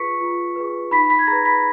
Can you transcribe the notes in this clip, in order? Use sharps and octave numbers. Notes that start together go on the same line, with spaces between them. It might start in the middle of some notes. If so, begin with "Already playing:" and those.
Already playing: F4 G#4 B4 C#6 B6 C#7
F4
G#4 B4
D#4 B5 B6
B5 B6
G#6
G#4 B4 A#5 A#6
B5 B6